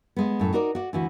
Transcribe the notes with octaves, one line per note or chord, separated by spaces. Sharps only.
G#3 B3
F#2 A2
D#4 F#4 A#4 D5
F#4 D5
D2 E3 F#4